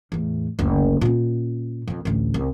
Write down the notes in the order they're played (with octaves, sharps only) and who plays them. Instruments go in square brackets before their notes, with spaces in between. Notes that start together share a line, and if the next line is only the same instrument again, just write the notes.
[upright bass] E2 A2
F#1 D2
A#2 C#4
F2 B2
A1 D2
C2